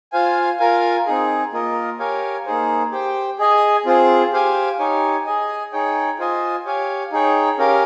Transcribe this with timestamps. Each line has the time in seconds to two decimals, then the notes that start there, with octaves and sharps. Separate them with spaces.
0.12 F4 C5 F5 G#5
0.59 F4 A#4 F5 G#5
1.06 C4 D#4 G#4
1.53 A#3 F4 A#4 D#5
1.99 G4 A#4 C#5 F5 G#5
2.46 A#3 D#4 G#4 C5
2.92 G4 C5 G5
3.39 G#4 D#5 G#5
3.86 C4 F4 G#4 C5
4.33 G4 C5 F5 G#5
4.79 D#4 G4 C#5 G#5
5.26 G#4 D#5 G#5
5.73 D#4 G#4 C#5 G5
6.19 F4 C5 D#5 G#5
6.66 G4 C#5 F5 G#5
7.12 D#4 G#4 C#5 G5
7.58 C#4 G4 A#4 F5